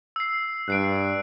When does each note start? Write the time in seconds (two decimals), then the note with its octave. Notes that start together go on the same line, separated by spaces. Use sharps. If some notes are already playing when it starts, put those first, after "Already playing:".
0.16 E6 C7
0.68 G2 F#6 C7 D7